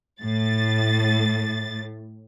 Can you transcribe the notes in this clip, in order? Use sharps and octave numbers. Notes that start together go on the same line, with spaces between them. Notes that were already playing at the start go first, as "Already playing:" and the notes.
A2 A6